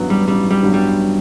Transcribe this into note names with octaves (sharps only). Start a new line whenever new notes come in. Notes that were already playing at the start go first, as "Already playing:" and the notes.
Already playing: A1 G2 F#3 B3 F#4
G3
A1 G3
G3
G2 F#3 B3 F#4
G3